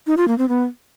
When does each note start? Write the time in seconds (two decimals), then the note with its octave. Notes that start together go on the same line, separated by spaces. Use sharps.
0.07 D#4
0.17 F4
0.28 A#3
0.38 C4
0.49 B3